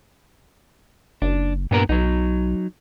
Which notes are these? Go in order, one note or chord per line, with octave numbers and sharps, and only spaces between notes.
F#1 D4
G2 A#2 B3 A#4
B1 F#3 D#4